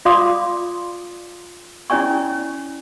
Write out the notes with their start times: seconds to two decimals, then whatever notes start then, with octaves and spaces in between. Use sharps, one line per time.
0.05 F4 D5 F5 C6 D6 D#6
1.90 C#4 E4 C#5 D5 G#5 C#6